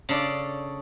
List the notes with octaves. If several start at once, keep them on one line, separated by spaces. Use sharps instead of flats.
C#3 D4 A4 D5